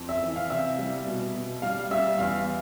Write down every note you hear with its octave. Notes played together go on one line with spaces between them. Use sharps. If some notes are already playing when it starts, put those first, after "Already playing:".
Already playing: F2
E5
E3
F5
C3 E5
G3
B2
B2
G3 F5
G3 E5
E2 F5